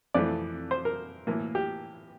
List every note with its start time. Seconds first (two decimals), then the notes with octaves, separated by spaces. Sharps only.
0.14 F2 E3 A3 D5
0.71 C5
0.85 A#4
1.27 A2 E3 A#3
1.55 G4